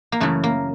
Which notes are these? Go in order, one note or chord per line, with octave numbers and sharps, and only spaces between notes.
A#3
F#2 C#3 E3 A3
A#3